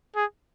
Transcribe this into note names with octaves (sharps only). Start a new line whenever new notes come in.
G#4